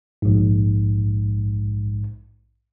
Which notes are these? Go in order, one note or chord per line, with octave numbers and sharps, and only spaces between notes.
A#1 G#2